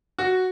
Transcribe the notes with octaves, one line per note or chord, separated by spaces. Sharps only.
F#4